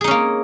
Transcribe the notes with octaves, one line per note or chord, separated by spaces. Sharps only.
A#3 C#4 D#4 G#4